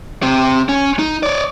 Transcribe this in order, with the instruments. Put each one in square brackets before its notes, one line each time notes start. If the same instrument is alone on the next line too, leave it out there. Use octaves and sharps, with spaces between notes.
[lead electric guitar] C3 C4
C#4
D#4
C#5 D5